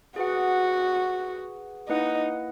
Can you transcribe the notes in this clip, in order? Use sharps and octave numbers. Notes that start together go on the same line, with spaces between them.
F#4 G#4 B4 F#5
A#3 D#4 E4 B4 D#5 F#5